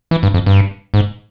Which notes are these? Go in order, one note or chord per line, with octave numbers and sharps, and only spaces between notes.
E3
G2
F2
G2
G#2